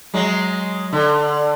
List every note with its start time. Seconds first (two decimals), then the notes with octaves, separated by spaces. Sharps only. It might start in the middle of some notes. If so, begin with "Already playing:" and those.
0.14 F#3 G#3
0.93 D3